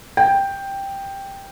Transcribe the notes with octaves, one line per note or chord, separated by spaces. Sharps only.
G5